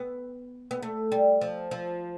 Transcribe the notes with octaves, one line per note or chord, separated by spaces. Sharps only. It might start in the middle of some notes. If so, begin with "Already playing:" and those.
Already playing: B3
B3
A3
G3
F3
F3